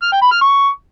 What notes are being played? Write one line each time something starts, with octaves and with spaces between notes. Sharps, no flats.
F6
G5
B5
F6
C#6